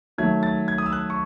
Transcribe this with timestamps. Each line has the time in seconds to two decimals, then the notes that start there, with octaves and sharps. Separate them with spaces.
0.18 D#3 F#3 A3 G#6
0.43 A6
0.68 G#6
0.78 D#6
0.86 E6
0.92 F#6
1.10 C#6